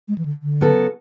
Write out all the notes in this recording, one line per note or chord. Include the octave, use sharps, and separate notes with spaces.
G#3
E3
D3
D3
C#3 F#3 B3 F#4 A4